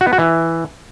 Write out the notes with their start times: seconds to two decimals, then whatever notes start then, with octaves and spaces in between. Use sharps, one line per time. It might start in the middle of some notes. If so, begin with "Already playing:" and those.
0.01 F#4
0.07 B3
0.13 F#4
0.19 E3